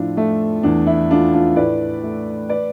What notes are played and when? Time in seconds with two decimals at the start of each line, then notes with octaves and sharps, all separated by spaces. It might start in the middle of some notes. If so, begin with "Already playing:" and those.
Already playing: F2 A2 D4 F4
0.17 A3
0.63 E2 D4
0.87 E4
1.10 A3 D4 F4
1.34 D4 F4
1.56 A2 B4 D5
2.03 A3
2.49 B4 D5